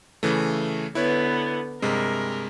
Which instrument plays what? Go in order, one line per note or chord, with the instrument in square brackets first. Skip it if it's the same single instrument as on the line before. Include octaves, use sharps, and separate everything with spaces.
[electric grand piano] C#3 E3 A3
[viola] D3 B3 [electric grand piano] E4 B4 C#5
[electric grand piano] G2 C3 G#3 [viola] A#4